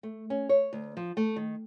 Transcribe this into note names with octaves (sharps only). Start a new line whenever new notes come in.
A3
C#4
C#5
D2
F3
A3
D#3